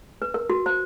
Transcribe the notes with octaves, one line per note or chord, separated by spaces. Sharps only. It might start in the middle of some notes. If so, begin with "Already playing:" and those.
B4
A#4
F#4
C5